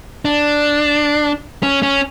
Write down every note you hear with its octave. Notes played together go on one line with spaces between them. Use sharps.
D4
C#4
C#4